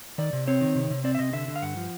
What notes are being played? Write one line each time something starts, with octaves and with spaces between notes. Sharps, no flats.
D#3 D5
C3
C4 C#5
D#3
C3
C3
C4 D5
E5
C3 D#5
D3 E5
D3
F5
G2 F#5
F3